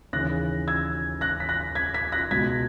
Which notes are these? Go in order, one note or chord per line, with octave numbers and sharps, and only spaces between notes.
D#2 C#3 E3 F#6 A#6
E6 G#6
F#6 A#6
B6
F#6 A#6
G#6 B6
G#6 B6
F#6 A#6
C#2 B2 G#6 B6